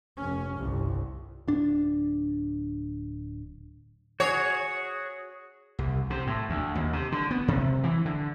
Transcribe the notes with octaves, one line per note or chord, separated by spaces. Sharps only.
F1 C#4
G1 C2
D1 D4
F#4 G#4 C#5
C2
C3
A2
D2
D#2
C3
D3
B3
C3
E3
D3